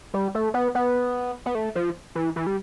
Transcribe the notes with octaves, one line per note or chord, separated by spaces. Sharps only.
G3
A3
B3
B3
B3
A3
F3
E3
E3
G3